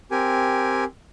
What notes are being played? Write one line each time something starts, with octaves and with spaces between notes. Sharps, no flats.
C4 G4 A#4 G#5